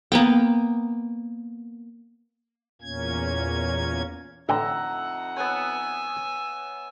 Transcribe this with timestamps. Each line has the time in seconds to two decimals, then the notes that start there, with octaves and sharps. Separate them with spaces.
0.12 A#3 B3 G5
2.82 E2 A#2 A#3 C#4 G#6
4.49 A1 F2 D3 D#4 E5 F#5 G5 A#5
5.37 B3 B4 C#5 G#5 E6